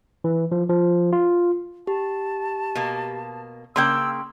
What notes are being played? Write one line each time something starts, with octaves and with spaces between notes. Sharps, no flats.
E3
F3
F3
F4
G4 A5
B2 A#3
C#3 A#3 G5 C6 E6